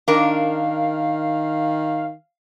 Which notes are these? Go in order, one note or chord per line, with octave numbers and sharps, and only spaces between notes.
D#3 D4 A#4 F5